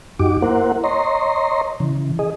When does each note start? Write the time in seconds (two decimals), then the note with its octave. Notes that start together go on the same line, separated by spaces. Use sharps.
0.19 F#2 D#4 F#4 G4 D6
0.42 A#3 E4 A#4 C5 F#5
0.84 C#5 D#5 A#5 C6
1.80 C#3 E3
2.19 G#4 D#5